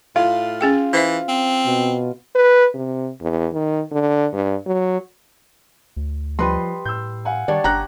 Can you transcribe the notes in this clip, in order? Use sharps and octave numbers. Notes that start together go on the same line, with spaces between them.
A2 F4
C#4 G#4 G5
E3 C5 E5
C4
B2
B4
C3
E2
D#3
D3
G2
F#3
D2
F3 G3 B4 D#5 C6
A2 E6 G6
F5 F#5 G#5
D#3 G3 D4 C#5 D5
G1 G4 A#5 F#6